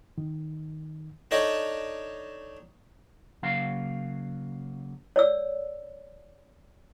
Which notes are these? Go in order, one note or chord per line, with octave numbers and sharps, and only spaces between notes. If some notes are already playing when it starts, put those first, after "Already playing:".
D#3
D4 D#4 A4 C#5 D#5 G5
C#3 F#3 A#3 F5
C#5 D5 E6